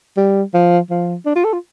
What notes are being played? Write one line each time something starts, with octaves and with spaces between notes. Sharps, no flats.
G3
F3
F3
D4
F4
A4
F4